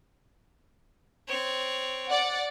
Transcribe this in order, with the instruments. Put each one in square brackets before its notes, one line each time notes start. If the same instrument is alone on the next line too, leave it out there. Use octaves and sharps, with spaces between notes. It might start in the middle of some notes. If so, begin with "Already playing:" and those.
[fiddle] C4 C#5
[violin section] D5 F#5